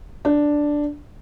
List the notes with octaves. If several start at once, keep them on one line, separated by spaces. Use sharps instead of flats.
D4